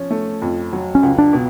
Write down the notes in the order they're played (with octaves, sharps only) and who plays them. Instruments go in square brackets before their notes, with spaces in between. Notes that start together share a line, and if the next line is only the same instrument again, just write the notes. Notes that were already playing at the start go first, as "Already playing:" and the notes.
Already playing: [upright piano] F3 C#4
A3
F2
F#3
[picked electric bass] C#4
[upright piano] C#2
[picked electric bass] D4
[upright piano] B2